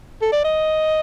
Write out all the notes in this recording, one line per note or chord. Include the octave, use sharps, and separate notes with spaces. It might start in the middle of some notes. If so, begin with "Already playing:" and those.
A4
D5
D#5